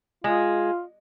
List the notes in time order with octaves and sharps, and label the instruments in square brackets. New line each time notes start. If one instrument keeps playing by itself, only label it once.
[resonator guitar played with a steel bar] G#3 [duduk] F4